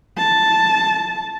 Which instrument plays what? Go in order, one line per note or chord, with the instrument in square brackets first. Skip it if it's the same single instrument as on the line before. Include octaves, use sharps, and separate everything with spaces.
[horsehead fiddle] A5